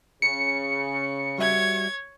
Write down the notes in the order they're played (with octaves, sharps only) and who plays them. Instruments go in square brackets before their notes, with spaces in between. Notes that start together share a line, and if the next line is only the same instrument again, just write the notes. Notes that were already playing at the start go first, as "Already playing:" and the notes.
[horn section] C#3 [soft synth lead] C#7
[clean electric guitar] G3 F#4 E5 [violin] C#5 G#6